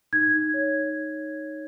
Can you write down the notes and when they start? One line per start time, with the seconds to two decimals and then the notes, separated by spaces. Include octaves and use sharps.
0.13 D#4 G#6
0.34 D#4
0.54 C#5